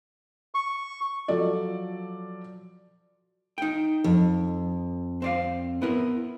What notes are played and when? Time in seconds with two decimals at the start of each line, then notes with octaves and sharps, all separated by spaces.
0.55 C#6
1.28 F3 F#3 F4 A4 D5
3.58 D#4 G5
4.04 F2
5.22 C4 D5 F5
5.82 B3 E4 A#4